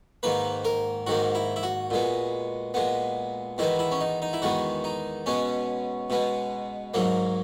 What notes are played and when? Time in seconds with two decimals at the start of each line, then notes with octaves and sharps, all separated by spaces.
0.23 G#2 D#3 A#3 B4
0.65 A#4
1.07 G#2 D#3 A#3 F#4
1.35 E4
1.56 E4
1.63 F#4
1.90 A#2 G#3 B3
2.74 A#2 G#3 B3
3.58 E2 D#3 G#3 B3 E4
3.79 E4
3.91 C#4
4.01 D#4
4.22 D#4
4.33 E4
4.42 E2 D#3 G#3 B3 F#4
4.84 D#4
5.26 B2 G#3 B3 C#4
6.10 B2 G#3 B3
6.94 G#2 F#3 A#3